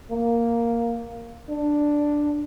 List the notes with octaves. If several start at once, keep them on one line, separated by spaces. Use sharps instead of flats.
A#3
D4